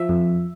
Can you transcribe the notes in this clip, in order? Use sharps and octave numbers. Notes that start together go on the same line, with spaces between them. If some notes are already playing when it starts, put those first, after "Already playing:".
Already playing: F3 E5
F2